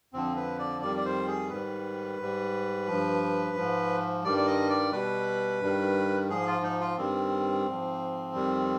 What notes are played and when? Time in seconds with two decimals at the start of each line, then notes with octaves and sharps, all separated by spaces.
0.13 F2 D3 F3 C4
0.36 B4
0.59 D5
0.81 F2 D#3 G3 D5
0.97 D5
1.05 C5
1.27 G#4
1.50 G#2 D#3 G3 B4
2.19 G#2 G3
2.87 G2 F3
3.56 G#2 F3
4.24 G2 D#3 G3 D5
4.37 D5
4.47 D#5
4.70 D5
4.92 B2 G3 B4
5.61 G2 D#3 G3
6.29 G#2 F3 G#4
6.47 F4
6.63 D#4
6.80 F4
6.97 G2 D#3 G3 C4
7.66 G#2 F3
8.34 F2 D#3 G3